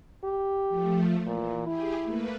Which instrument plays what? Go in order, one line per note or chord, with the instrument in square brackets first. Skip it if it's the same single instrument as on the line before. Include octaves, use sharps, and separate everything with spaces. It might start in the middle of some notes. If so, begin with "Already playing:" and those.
[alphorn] G4
[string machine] F3 A3
[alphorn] A#2 [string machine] E3
[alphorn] E4 [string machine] G4 G#4
[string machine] A3 A#3 B4